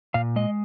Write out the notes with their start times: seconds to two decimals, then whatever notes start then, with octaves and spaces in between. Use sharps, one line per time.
0.14 A#2 F5
0.36 G#3 D#5